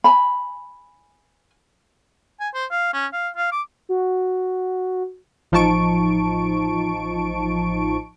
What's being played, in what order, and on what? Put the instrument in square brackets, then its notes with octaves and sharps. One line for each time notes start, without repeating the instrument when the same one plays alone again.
[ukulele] G#5 B5
[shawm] G#5
C5
F5
C#4
F5
F5
D6
[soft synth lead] F#4
[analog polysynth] A1 F3 D#4 A5 C#6 D7